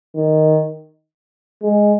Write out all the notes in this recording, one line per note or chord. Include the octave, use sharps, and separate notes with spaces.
D#3
G#3